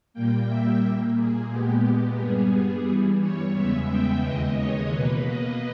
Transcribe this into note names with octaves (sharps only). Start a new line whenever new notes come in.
A#2 G3 A#3 G5
E5
A#2 A#3
G#4
A#2 G#3 B3 G4
G4
G2 G3 B3 G#4
G2 E3 G3
C#5
E2 C#3 G#3 B3 E5
G5
D#2 C#3 E3 G#3 D#5
C#5
B2 A#3 B4
D#5